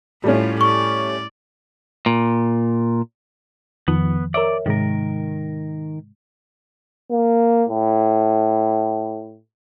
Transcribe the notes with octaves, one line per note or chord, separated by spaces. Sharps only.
A2 G3 A3 C#4 F4
D5 C#6
A#2
F2 D#3 F3 B3
A#4 C#5 D5 E5
G#2 C3 D#3 G#3 A#4
A#3
A2